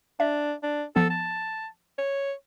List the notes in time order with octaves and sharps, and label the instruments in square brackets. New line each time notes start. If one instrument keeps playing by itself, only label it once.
[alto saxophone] D4 [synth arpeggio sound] E5
[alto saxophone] D4
[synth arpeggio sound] F3 B3 [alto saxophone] A4
[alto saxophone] A5
C#5